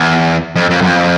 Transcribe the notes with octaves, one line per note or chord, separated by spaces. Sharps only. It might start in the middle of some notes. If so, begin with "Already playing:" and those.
Already playing: E2
F2
F2
F#2
F2